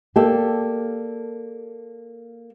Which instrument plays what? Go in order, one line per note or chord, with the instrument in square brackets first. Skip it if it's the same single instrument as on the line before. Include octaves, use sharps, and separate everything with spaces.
[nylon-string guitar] A#3 G4 A4 D5